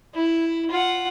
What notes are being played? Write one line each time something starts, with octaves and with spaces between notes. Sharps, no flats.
E4
F4 F#5